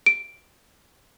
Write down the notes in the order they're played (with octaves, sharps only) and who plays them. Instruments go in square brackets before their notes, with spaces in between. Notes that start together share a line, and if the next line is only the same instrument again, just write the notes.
[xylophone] D7